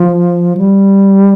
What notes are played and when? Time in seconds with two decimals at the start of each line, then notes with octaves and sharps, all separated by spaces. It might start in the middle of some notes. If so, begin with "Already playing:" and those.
Already playing: F3
0.57 G3